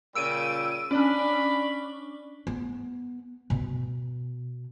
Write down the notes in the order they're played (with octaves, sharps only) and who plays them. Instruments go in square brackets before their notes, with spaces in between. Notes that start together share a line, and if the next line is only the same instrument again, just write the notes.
[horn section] A#2 C#3 G3 [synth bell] E6 D7 D#7
[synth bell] C#4 D4 [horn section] D5 B5
[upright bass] B3
B2